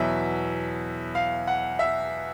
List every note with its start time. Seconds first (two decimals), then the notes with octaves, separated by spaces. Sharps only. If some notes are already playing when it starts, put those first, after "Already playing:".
Already playing: E2 B2 F#3 E5
1.15 F5
1.47 F#5
1.79 E5